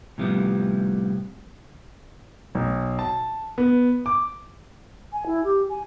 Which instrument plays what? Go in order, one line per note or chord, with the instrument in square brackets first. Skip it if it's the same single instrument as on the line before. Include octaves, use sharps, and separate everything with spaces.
[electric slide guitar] A2 C3 F3 G3 B3
[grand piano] B1
A5
B3
D6
[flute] G#5
E4
G4
G#5